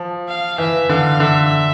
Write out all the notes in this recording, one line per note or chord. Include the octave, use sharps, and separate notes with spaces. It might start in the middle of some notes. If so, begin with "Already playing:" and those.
Already playing: F3
F5
E3 E5
D3 F5
D3 E5